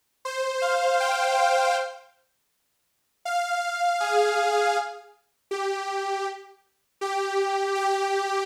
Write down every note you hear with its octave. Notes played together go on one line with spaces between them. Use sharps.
C5
F5
G5
F5
G#4
G4
G4
G4